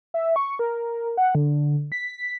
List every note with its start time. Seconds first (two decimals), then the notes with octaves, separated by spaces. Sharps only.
0.14 E5
0.36 C#6
0.59 A#4
1.17 F#5
1.35 D3
1.92 B6